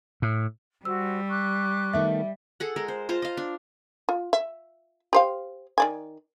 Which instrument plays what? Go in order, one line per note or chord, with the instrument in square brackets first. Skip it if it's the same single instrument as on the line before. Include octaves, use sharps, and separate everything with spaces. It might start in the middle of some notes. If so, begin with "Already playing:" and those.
[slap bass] A2
[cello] G3 [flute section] F#4 C5 [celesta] E6
[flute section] C#6 D6 F#6
[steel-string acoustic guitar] D#3 A3 B3 [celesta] E5
[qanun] G#4 A4 F#5
G#3 A#4
C5
F4 C5 A5 A#5
D#5 F5
D4
[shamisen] F4
E5
G4 C5 F5
D#3 D5 G#5